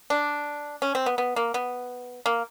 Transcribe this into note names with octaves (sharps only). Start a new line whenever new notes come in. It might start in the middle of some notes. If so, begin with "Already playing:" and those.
D4
C#4
C4
B3
B3
A#3
B3
A#3